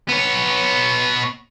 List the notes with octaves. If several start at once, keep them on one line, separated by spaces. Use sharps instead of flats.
B3 C#5